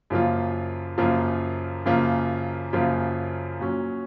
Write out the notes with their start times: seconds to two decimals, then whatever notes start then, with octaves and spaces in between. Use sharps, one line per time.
0.10 F#2 C#3 F3 A#3 F4
0.98 F#2 C#3 F3 A#3 F4
1.86 F#2 C#3 F3 A#3 F4
2.73 F#2 C#3 F3 A#3 F4
3.60 A#2 F#3 C#4